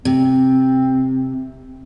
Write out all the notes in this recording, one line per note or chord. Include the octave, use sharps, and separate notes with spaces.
C3 C4